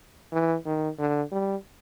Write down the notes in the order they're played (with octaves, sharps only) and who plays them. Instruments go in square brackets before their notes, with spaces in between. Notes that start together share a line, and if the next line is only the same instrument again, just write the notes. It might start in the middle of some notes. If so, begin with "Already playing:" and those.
[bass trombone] E3
D#3
D3
G3